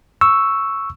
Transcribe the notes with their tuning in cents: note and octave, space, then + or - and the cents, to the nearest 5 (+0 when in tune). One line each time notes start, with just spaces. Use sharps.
C#6 +0 E6 +0